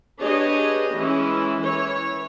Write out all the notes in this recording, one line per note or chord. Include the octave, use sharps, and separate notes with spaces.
D4 G4 G#4 B4 C#5 D#5
E3 G#3 C#4 E4
E3 C#5